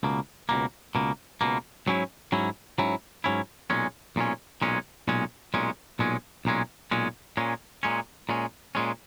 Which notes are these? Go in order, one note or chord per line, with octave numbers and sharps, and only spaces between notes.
C#2 B2 A#3
C#2 B2 A#3
C#2 B2 A#3
C#2 B2 A#3
G#2 F#3 C#4 E4
G#2 F#3 C#4 E4
G#2 F#3 C#4 E4
G#2 F#3 C#4 E4
B1 A#2 G#3 C#4
B1 A#2 G#3 C#4
B1 A#2 G#3 C#4
B1 A#2 G#3 C#4
B1 A#2 G#3 C#4
B1 A#2 G#3 C#4
B1 A#2 G#3 C#4
B1 A#2 G#3 C#4
A#2 G#3 C#4
A#2 G#3 C#4
A#2 G#3 C#4
A#2 G#3 C#4